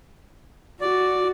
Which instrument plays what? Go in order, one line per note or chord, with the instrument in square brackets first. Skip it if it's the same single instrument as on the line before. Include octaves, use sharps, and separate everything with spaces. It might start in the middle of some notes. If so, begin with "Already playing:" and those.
[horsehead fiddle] F#4 [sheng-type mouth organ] D5